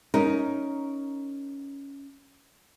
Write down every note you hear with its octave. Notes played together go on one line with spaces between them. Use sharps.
C#4 D#4 A#4